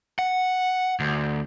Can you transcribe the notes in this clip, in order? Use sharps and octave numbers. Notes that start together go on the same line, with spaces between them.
F#5
D2